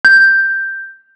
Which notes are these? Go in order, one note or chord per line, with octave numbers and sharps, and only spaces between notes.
G6